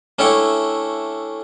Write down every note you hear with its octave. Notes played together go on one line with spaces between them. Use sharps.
A3 C#4 D4 E4 C#5 G5